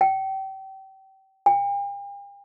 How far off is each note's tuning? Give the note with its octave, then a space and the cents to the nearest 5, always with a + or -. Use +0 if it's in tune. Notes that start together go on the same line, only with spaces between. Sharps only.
G5 -30
G5 +45